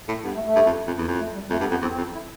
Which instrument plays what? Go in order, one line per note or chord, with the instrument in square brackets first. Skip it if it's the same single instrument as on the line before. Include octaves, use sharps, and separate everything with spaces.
[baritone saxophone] A2
[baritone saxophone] G2 [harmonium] B3
[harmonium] A3
A3
[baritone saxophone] G2
F2
F2
E2
F2
[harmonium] A3
G3
[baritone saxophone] F2 [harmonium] A3
[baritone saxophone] G2 [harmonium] B3
[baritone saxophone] F2 [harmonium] B3
[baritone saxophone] E2 [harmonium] C4
[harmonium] C4
[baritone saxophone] F2
[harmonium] E4